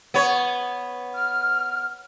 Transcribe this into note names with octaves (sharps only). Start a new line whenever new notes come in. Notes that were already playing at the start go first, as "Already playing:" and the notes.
B3 C#5
F6